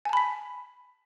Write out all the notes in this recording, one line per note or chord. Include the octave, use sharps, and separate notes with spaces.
G#5 A5 B5 B6